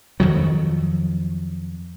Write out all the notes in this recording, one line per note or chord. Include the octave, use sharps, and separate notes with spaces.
F2 D#3 F#3